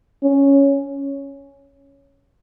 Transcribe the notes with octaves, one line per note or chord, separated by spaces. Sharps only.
C#4